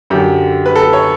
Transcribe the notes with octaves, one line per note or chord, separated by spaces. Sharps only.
F#2 D3 G4
B4
A4
C#5